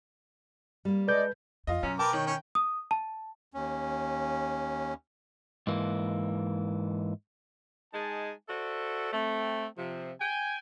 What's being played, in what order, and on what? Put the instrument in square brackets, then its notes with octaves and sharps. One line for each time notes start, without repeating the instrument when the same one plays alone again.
[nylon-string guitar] G3 A#3
[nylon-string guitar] G#3 A4 [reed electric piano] B4 G6 [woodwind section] D5 D#5
[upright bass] F2 [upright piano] F4 D#5
[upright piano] F#2 [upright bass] B2 [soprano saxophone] C#4
[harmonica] A#4 B4 D6 [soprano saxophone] G5 [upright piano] A5
[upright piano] D#3 [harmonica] C#5
[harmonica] C#4 C#5
[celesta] D#6
A5
[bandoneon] D#2 C#4
[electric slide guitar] G#2 E3 A#3
[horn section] G#3 D#4 G#5 A5
F#4 A4 C5 D5 E5
A3 C4
C3 F3
G5 G#5